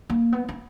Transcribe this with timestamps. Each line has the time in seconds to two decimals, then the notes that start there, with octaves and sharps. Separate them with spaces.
0.10 A#3
0.33 B3
0.49 C#4